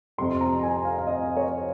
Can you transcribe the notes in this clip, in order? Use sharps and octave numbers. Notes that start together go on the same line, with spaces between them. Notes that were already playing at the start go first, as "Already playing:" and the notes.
F2 C3 G3 C6
A#5
G#5
F5
F5
D#5
C#5